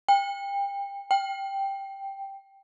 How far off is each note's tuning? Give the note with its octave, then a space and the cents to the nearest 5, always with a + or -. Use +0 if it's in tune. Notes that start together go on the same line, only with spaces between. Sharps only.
G5 +30
G5 +0